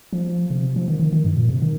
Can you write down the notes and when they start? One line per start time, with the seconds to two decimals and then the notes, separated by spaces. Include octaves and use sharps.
0.13 F3
0.50 C3
0.76 F3
0.88 D#3
1.00 D#3
1.13 D#3
1.25 G2
1.37 A#2
1.49 C3
1.62 D#3